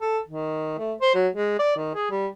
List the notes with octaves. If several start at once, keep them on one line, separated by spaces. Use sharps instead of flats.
A4
D#3
A3
C5
F#3
G#3
D5
D#3
G#4
G3